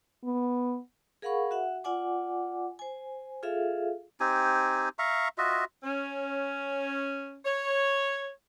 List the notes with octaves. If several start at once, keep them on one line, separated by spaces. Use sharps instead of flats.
B3
G#4 A#4 F5 F#5 B5 C#6
F#4 E5 F#5
F4 D5 F#5 G#5 D6
C5 G#5
F4 G#4 A4 E5 F5
C4 D#4 G4 G#5
E5 F5 A#5 C#6
F4 F#4 D#5 E5
C#4
C#5